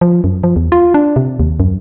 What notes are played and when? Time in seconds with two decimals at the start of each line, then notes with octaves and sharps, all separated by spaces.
0.01 F3
0.24 F#2
0.43 F3
0.56 E2
0.72 F4
0.94 D4
1.16 C3
1.40 D#2
1.60 F#2